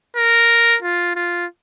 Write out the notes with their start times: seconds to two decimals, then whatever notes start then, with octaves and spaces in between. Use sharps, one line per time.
0.17 A#4
0.82 F4
1.16 F4